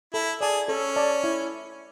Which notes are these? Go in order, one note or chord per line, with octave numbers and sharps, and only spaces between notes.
E4 A4
G#4 D5 A5
C#4 A4
D5 A5
E4